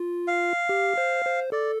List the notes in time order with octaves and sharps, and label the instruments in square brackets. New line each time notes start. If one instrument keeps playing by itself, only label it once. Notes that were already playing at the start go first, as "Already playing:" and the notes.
Already playing: [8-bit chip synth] F4
[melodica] F5
[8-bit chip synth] G4
C5
C5
[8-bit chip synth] A4 [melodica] D5